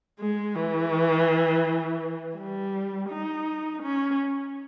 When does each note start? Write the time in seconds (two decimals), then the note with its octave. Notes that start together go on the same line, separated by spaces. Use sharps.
0.20 G#3
0.55 E3
2.37 G3
3.10 D#4
3.82 C#4